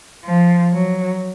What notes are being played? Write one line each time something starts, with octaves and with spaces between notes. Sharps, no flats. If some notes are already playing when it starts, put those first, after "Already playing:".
F3
F#3